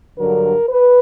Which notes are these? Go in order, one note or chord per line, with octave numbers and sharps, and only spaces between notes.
G2 D3 F#3 A#4
B4